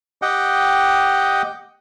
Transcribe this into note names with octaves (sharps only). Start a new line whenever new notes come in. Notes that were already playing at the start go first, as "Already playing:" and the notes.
G4 D#5 F#5 G5